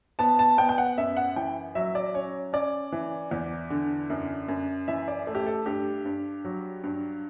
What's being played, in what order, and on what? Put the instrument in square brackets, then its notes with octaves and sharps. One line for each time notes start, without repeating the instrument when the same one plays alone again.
[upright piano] B3 A5
A5
B3 G5
G5
F#5
F#2 E5
F#5
E3 G5
F#3 E5
D5
C#4 C#5
C#4 D5
E3
E2
D3
F#2
F#2
E3 E5
D5
A3
G4
A4
G2 G4
G2
F#3
G2